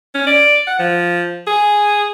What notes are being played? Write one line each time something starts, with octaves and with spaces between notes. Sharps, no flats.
C#4
D5
F#5
F3
G#4